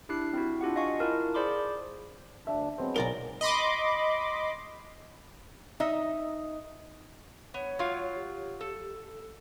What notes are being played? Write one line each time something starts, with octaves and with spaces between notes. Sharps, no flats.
D4 E4 G4 F#6 C7
C4 E4 F#4
D4 F4 G4 F#5
D#5 F5 G#5 C#6
E4 F4 A#4 A5
G#4 C5 D5 B5 C6 D6
D2 D4 E5
F#3 G#3 B3 C4
B1 A#4 D5 A#5 G7
D#5 B5 C6 D6
D#4 D#5 E5
B3 C#5
F#3 F4 F5
G4
A4